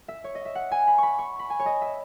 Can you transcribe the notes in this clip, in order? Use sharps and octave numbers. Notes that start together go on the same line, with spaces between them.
E5
C#5
D#5
E5
F#5
G#5
B5
B5 C#6
C#6
B5
G#5
C#5
D#5
E5